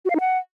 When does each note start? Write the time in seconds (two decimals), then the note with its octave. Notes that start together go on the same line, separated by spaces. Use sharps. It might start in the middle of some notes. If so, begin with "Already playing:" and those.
0.05 F#4
0.10 F5
0.15 D#4
0.20 F#5